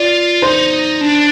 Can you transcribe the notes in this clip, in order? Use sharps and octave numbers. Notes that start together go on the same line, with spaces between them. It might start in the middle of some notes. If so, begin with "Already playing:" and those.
Already playing: F4 D5
D#4 C5
D4